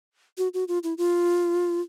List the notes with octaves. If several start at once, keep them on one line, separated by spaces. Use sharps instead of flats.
F#4
F#4
F4
E4
F4